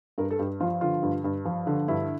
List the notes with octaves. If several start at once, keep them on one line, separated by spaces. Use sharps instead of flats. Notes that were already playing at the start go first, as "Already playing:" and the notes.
G2 A#4
A4
G2 G4
F3 F4
D3 F4
G2
G2
F3
D3
G2 E4